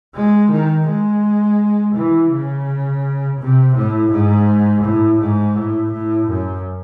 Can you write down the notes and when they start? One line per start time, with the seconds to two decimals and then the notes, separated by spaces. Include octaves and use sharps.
0.14 G#3
0.51 D#3
0.87 G#3
1.95 E3
2.31 C#3
3.40 C3
3.75 A2
4.12 G#2
4.83 A2
5.20 G#2
5.55 A2
5.92 A2
6.28 F#2